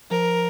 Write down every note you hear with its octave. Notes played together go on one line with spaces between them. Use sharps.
F3 A#4